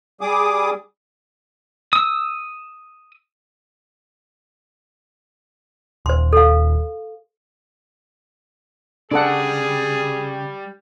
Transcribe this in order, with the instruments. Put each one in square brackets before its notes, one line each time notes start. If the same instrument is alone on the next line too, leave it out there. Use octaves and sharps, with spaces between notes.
[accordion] G3 G#4 D6 D#6
[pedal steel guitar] D#6 E6
[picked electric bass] D#1 [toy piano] C5 C6
[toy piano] A4 F5
[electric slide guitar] C#3 [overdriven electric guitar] G3 D5 [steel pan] D4 A4 F#5 [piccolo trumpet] G#4